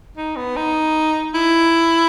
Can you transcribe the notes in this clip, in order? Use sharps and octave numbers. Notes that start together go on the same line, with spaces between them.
D#4
B3
D#4
E4